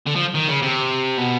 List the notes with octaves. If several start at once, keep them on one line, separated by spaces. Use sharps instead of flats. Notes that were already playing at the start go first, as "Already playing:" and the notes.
D3
F3
D#3
C#3
C3
B2